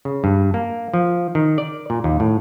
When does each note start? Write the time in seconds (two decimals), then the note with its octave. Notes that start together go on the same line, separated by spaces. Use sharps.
0.05 C#3
0.24 G2
0.54 A#3
0.94 F3
1.35 D#3
1.58 D5
1.90 A#2
2.04 D#2
2.20 A2